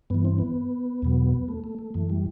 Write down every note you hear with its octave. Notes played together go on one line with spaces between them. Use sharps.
G2 E3 B3
C4
B3
E2 B2 F#3
A3
A3
A3
F#2 E3 A3
G3